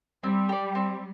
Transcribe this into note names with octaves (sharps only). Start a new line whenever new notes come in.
G3 C4
G4 D5
C4